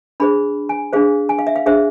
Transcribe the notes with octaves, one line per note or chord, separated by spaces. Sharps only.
D4 G#4 C5 B5
G#5
D4 G#4 C5 F5
G#5
F5
E5
F5
D4 G#4 C5 E5